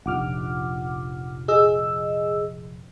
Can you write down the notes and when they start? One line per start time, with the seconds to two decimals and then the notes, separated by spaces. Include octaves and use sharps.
0.06 F1 A#1 F#5 D6 F6
1.48 G#4 D#5 E6